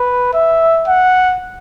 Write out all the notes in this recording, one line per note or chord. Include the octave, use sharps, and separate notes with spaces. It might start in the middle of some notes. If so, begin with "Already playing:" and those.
Already playing: B4
E5
F#5